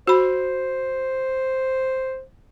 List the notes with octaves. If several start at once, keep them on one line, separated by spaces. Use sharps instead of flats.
F#4 C5 B5